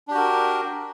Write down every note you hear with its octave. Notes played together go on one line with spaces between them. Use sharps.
D4 F#4 G4 A#4